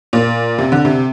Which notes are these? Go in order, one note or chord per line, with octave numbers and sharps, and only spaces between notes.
A#2
C3
D3
C3